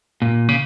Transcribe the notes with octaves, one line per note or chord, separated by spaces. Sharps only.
A#2
C#3